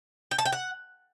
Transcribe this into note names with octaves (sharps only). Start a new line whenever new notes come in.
G5
A5
G5
F#5